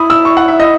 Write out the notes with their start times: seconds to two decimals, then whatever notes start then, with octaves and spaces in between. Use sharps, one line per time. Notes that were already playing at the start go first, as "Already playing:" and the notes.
Already playing: E4 B5 D#6
0.10 E6
0.25 C#6
0.37 F#5
0.48 E5
0.60 D#5